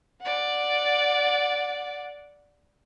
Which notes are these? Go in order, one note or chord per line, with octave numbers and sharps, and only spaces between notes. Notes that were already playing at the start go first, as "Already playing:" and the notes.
D5 F#5